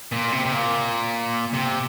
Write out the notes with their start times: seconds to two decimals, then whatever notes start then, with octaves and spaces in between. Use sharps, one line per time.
0.12 A#2
0.32 C3
0.45 C3
0.52 A#2
1.54 C3